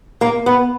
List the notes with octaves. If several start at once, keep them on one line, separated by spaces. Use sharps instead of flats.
A#3
B3